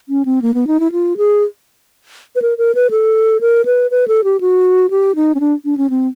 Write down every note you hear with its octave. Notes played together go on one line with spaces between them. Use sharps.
C#4
C4
A#3
B3
D#4
E4
F4
G#4
B4
A#4
A#4
B4
A4
A#4
B4
B4
A4
G4
F#4
G4
D#4
C#4
D4
D4
C#4
C4